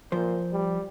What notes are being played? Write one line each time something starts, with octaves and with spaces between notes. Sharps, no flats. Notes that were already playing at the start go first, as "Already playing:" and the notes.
A#2 F3 C5
G3